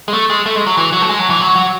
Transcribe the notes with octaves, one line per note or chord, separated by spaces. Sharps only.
G#3
A3
G#3
A3
G#3
F#3
E3
F#3
A3
G#3
F#3
E3
F#3
F#3